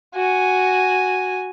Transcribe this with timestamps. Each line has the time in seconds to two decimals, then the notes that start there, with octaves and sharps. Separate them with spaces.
0.14 F#4 G#5